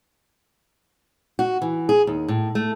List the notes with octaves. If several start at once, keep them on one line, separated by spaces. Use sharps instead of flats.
F#4
E3
G#4
D#2
A2
A3